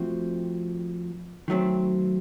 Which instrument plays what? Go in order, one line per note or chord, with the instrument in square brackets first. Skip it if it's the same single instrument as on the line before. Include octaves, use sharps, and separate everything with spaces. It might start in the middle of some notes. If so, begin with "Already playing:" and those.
Already playing: [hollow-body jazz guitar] F3 A3 C4 F#4
D#3 F#3 A3 C4